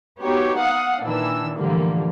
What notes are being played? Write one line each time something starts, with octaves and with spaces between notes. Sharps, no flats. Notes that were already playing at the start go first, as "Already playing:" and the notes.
B3 D#4 F#4 G4 C#5
F5 F#5 D#6
A#2 D#3 E3 D4 E6
A2 D3 E3 F3 G3 A#3